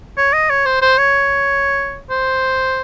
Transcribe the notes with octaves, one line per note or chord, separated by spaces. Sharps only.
C#5
D#5
C#5
C5
C5
C#5
C5